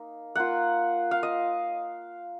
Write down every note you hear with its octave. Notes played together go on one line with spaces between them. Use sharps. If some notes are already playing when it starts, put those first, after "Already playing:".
Already playing: A#3 D#4
A#3 F4 F#5
F5
D#5